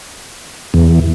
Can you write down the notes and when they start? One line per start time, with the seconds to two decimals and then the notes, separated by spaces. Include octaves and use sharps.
0.74 E2